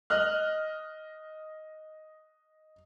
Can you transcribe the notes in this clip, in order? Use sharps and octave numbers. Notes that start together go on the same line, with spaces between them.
D#5 F6 F#6